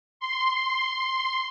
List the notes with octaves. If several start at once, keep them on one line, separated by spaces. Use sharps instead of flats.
C6